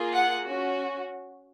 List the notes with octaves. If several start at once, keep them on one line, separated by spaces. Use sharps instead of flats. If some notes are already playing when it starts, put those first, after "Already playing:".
Already playing: A#3 F4 G#4
F#5
C#4 F#4